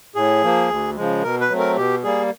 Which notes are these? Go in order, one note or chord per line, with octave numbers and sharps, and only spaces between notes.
A2 G#4
F3 A#3
D2
C#3 F3 G#3
B2 A#4
B4
F#3 A3 C4
A#4
B2 G4
G3 A#3 G#4